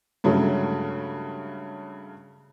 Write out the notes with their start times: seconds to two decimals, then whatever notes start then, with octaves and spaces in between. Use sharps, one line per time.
0.24 G2 C#3 F#3 G#3 A3